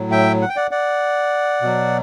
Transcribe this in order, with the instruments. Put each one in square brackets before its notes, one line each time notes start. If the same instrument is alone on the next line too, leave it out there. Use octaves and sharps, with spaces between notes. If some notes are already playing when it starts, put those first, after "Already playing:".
Already playing: [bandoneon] A2 F#3
E5 G5
F#5
G5
D5 F#5
D5 F#5
B2 F#3